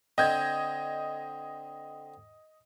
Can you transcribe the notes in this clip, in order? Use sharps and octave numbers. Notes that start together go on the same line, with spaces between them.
D3 C4 D#5 G6 G#6